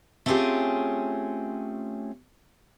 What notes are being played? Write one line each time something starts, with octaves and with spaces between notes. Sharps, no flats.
A3 C4 C#4 F4 G4 G#4